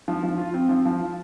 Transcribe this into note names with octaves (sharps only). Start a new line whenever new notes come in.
F3
F3
F4
C4
F3
F3
F4